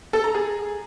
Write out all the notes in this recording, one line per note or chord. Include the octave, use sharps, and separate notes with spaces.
A4
A#5
G#4